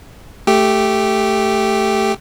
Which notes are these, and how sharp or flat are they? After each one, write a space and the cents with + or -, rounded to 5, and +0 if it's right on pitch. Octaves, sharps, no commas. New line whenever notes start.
A3 +0 G4 +0